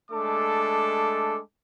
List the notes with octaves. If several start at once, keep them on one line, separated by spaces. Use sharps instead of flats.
G#3 A3 D4 A4 D6